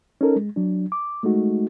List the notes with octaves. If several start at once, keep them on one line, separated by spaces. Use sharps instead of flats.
C#4 D#4 A4 A#4
G#3
F#3 D4
D6
G#3 A3 D#4 F#4